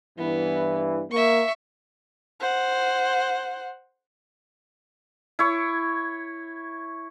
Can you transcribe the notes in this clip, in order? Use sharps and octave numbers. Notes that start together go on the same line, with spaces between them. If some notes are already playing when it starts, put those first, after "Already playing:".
G2 E3 B3
A#3 E5 C#6
C5 F#5
E4 C#5